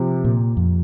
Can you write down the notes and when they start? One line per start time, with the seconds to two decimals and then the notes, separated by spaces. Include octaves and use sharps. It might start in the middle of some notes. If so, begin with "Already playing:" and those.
Already playing: C3 F3 C4 G4
0.24 A#2
0.57 F2